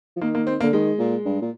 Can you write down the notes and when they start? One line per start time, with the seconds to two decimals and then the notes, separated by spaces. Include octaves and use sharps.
0.16 F3
0.21 D#3 A#3
0.35 A#3
0.47 C4
0.60 D3 A#3
0.73 D#3 G#3
0.99 A#2
1.25 G2
1.42 A#2